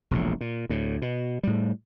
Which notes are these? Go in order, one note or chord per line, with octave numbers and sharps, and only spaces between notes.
E1 A#1 A2
A#2
D2 A2
B2
A2 G3